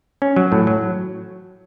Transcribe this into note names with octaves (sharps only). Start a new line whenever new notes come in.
C#4
F#3
A2
F#3